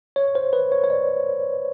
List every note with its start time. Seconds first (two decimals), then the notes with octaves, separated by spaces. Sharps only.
0.16 C#5
0.35 C5
0.53 B4
0.72 C#5
0.84 C#5
0.90 D5